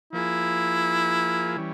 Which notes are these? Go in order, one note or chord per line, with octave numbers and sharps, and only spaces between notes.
F3 A#3 E4 F4 G#4
E3 G3 C#4